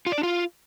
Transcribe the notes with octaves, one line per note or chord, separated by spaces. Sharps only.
F4
D5
D4
F4